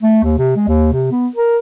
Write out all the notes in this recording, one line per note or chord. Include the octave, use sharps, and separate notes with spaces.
A3
D#2
C3
G#3
D#2
C3
B3
A#4